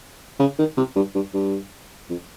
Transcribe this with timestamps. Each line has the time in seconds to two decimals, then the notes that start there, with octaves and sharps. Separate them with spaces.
0.40 C#3
0.59 D#3
0.77 C3
0.96 G2
1.15 G2
1.34 G2
2.10 F2